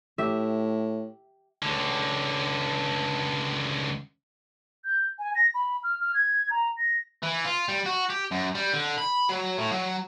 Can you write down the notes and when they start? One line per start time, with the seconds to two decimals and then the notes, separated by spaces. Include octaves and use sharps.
0.18 A2 G4 E5
1.63 C#2 D3
4.85 G6
5.19 G#5
5.35 A#6
5.54 B5
5.84 F6
6.01 F6
6.14 G#6
6.50 A#5
6.77 A#6
7.23 E3
7.44 F4
7.69 G3
7.86 F#4
8.10 G4
8.32 F#2
8.55 G3
8.73 D3
8.98 B5
9.29 F#3
9.58 A2
9.71 F#3